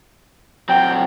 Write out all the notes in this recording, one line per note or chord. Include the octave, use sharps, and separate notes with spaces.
F#3 C4 G5